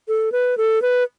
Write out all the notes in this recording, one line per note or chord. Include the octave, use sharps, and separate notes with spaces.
A4
B4
A4
B4